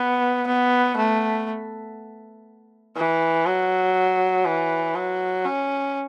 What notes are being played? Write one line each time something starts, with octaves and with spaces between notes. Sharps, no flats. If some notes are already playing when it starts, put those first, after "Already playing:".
Already playing: B3
B3
A3
E3
F#3
E3
F#3
C#4